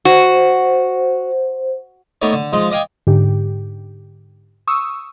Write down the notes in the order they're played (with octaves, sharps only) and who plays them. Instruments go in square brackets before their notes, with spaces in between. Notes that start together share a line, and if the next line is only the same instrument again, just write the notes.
[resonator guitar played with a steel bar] F#4 [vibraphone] C5
[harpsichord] A3 B3 D#4 C#5 D5
D3
F3 G#3 D#4 F4
D5 D#5 F5 G5 G#5
[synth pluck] G#2 D3 G4
C#6 D#6 E6